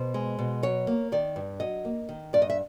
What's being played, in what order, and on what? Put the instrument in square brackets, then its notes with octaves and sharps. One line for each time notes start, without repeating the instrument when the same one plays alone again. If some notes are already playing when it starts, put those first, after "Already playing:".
Already playing: [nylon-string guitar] B2 C5
G#3
B2
F#3 C#5
A#3
D#3 D5
G2
F#3 D#5
A#3
D#3
G2 D5
D#5
E5